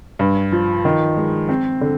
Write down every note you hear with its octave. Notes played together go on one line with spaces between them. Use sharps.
G2
F3
D#3
G#3
C4
D3